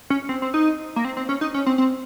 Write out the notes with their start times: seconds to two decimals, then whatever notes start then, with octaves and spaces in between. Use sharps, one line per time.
0.10 C#4
0.29 C4
0.42 C4
0.54 D#4
0.96 A#3
1.05 C4
1.17 C4
1.29 C#4
1.41 D#4
1.54 C#4
1.66 C4
1.78 C4